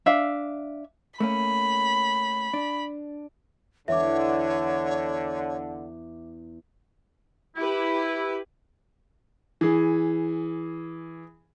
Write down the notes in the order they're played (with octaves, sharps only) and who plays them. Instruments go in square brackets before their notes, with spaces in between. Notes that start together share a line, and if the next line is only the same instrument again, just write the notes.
[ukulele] D4 E5 F5
[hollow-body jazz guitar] A3 A#3 C#4 [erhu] B5
[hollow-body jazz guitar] D4
[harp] E2 [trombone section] D3 [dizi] C#5 [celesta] E5 D6
[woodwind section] E4 [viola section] G4 B4
[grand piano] E3 G#4